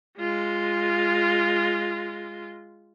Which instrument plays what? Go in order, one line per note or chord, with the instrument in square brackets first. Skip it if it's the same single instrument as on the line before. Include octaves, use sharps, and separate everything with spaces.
[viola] G#3 F4